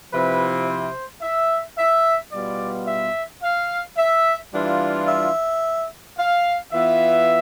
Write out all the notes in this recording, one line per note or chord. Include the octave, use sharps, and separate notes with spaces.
C3 F3 C4 E4 B4
C5
E5
E5
B2 G3 B3 F4 D5
E5
F5
E5
E3 G3 D4 F4
E5
F5
E3 B3 F4 E5